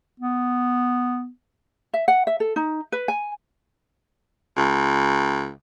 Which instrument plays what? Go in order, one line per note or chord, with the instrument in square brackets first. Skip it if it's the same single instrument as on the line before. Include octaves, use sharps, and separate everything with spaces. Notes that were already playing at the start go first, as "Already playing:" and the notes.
[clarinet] B3
[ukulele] E5
F#5
E5
A4
D#4
B4
G#5
[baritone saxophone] C#2